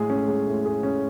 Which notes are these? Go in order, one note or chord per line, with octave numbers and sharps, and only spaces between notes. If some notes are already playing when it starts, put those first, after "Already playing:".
Already playing: A2 G#3 G#4
C#4
G#3
A2
G#4
C#4